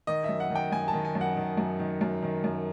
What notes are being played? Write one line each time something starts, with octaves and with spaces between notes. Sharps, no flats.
D#3 D#5
F#2 E5
F#5
D#3
G5
F#2 G#5
A5
D#3
G#5
F#2
F#5
D#3
F#2
D#3
F#2
D#3
F#2